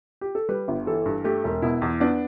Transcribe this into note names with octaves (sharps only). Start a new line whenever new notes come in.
G4
A4
G3 B4
G1
E3 A4
G2
A3 G4
E1
B2 E4
E2
B3 D4